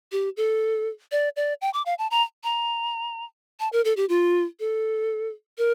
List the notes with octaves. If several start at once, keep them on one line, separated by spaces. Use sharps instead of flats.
G4
A4
D5
D5
G5
D6
F5
A5
A#5
A#5
A5
A#4
A4
G4
F4
A4
A#4